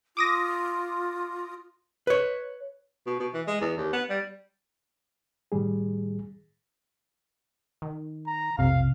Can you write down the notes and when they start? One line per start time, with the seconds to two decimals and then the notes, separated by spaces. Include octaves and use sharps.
0.17 F4 D6 D#6 A#6
2.07 B4 C#5
3.06 B2
3.20 B2
3.34 E3
3.47 G#3
3.61 E2
3.77 D#2
3.93 B3
4.10 G3
5.52 A2 D#3 G3 G#4
7.82 D#3
8.27 A#5
8.58 B1 F2 C3 F5